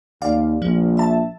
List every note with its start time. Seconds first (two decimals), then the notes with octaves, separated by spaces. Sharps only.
0.22 D#2 D5 F5
0.62 A#1 F3
0.97 E5 A5